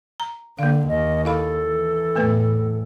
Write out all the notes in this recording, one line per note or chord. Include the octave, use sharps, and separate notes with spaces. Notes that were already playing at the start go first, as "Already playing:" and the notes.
A#5
D3 A#3 F5
D#2 D#5
E4 A4 F5 B5
E3
E2 A2 A3 B3 B4